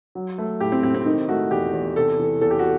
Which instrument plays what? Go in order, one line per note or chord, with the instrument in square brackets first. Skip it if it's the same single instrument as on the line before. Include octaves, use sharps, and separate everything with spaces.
[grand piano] F#3
A3
A2 G4
C4
A2 C4
C4
D#3 D#4
A3 F#4
E2 G4
E2
C3 A4
E3
E2 A4
G4
F#4